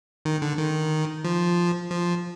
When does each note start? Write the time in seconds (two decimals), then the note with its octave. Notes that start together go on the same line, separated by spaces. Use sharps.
0.25 D#3
0.42 D3
0.58 D#3
1.24 F3
1.91 F3